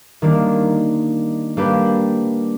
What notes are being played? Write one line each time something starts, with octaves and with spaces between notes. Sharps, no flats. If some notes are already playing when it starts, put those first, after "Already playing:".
D#3 G3 A#3 D4
G3 A#3 D4 G4 B4